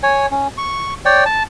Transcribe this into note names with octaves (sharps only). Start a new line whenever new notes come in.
C#5 G#5
C#4
C#6
C#5 D5 G5
A5